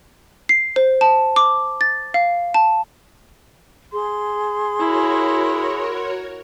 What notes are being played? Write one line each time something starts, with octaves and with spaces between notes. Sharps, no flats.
C7
C5
A5
D6
A6
F5
A5
G#4 C6
E4 F#4 A#4 C#5